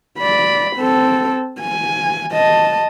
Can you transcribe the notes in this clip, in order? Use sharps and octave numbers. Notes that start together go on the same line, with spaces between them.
D5 B5
C4 A4
G#5
D#5 A5